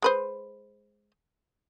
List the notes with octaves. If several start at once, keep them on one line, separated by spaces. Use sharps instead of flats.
G#3 B4 C5